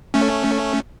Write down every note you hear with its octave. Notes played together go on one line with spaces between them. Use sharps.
A3 C#4